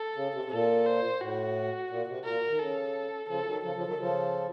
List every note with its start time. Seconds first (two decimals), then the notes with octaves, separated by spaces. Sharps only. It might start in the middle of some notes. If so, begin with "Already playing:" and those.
Already playing: A4
0.16 C#3
0.34 C3
0.45 C3
0.51 A#2 A4
0.86 C5
1.21 A2 F#4
1.90 A#2
2.07 C3
2.24 A#2 A#4
2.50 D#3
2.59 C#3 A4
3.28 C#3 F3 A4
3.46 D#3 F#3
3.63 C#3 F3 A4
3.75 C#3 F3
3.87 D#3 F#3
3.98 C#3 F3